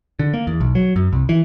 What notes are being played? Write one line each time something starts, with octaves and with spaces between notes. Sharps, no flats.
D3
A#3
E2
B1
F#3
F#2
C2
E3